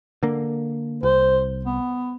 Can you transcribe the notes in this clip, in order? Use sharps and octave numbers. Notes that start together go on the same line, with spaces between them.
D3 A#3
C2 C5
B3